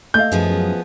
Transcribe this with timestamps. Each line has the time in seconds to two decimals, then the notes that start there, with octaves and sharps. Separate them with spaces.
0.14 A3 D#5 F5 G6
0.32 F#2 F3 B3 G#4